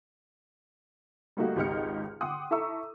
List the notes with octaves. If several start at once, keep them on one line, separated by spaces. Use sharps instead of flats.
G3 A3 A#3 D#4 F#4 G4
G#1 C#2 D#4 G4 F6 C#7
F#5 G5 C6 D6 D#6
E4 A4 E5 A#5 C#6 E6